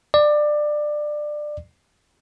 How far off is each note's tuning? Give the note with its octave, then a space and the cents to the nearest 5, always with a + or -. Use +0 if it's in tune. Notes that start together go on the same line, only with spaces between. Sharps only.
D5 +20